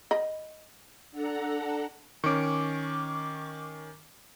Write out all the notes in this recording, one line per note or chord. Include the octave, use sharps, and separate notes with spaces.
D#5 B5
D4 A4 F#5 A#5
D#3 C#4 C#6 D6